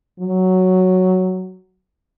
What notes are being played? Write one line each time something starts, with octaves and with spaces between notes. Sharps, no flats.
F#3